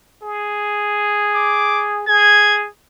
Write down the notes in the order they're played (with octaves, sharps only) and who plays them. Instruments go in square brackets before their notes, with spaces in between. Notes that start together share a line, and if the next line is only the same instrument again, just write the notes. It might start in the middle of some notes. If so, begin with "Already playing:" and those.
[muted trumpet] G#4
[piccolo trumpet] D6
[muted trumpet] G#4 [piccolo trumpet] G#6